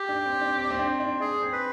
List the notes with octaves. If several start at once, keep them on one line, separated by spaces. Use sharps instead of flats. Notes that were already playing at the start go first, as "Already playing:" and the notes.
Already playing: G4
D4
C4
D4
C4
C4
D4
D4
D4 G#4
C4
B4